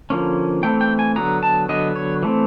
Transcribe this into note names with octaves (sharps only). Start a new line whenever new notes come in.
D3 F3 A#3 C#4
E3 A3 C4 G5
G5
G#5
D3 F#3 B3 A#5
A5
D3 F#3 B3 D#5
C#5
E3 A3 C4